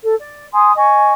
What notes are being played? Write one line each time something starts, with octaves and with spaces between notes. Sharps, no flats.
A4
D5
G#5 C6 D#6
D#5 G#5 C#6